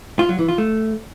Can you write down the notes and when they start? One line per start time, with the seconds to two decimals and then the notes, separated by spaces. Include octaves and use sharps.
0.19 F4
0.29 F#3
0.39 E3
0.48 F4
0.58 A3